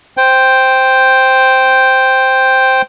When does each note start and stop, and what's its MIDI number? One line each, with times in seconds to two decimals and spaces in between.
0.17 2.82 72
0.17 2.82 79